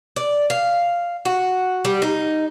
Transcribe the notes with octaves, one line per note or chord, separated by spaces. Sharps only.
D5
F5
F#4
G3
D#4